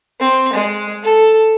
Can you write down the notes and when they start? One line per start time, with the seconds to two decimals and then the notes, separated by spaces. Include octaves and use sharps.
0.20 C4
0.53 G#3
1.03 A4